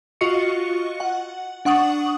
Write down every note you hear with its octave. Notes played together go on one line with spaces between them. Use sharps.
F4 F#4 D#5 C#6 C#7
F#5
D4 F#5 C#6 D#6 F#7